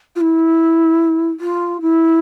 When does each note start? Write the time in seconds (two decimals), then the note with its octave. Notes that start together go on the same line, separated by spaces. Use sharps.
0.16 F4
0.21 E4
1.40 F4
1.81 E4